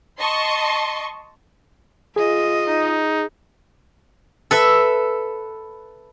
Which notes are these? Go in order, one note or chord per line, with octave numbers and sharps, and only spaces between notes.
D#5 A5 C6 C#6
F4 G#4 D#5
D#4
A4 B4 E5